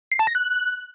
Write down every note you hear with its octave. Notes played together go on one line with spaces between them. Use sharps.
C7
A5
A#6
F#6